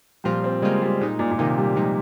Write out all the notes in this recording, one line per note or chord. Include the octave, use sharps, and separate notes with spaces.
A#2 F3 G3 C4 F4
C4
C#3 G3 G#3 A#3 F4
G3
A#2 G#3 D#4
A#2
A#2
C3 D#3 A#3 D#4
G3
C3 F3 G#3 D#4